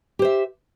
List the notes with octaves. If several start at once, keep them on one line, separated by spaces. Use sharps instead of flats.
G4 C5 E5